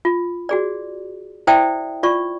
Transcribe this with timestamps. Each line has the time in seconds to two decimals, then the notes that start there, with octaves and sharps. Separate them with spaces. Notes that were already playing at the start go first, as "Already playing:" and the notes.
0.05 F4
0.49 F#4 G#4 D5
1.47 E4 C5 D5 E5 G5 D#6
2.03 F4 D5 C#6